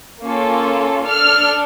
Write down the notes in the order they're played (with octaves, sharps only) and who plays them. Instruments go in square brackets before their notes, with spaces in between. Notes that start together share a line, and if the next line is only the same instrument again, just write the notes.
[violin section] A#3 C#4 F4 A4
D4 A4 F6